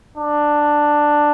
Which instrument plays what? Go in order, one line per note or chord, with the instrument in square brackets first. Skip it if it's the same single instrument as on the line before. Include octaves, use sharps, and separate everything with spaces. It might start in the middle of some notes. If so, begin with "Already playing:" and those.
[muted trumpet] D4